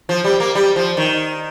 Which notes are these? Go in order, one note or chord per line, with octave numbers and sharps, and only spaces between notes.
F3
G3
A#3
G3
F3
D#3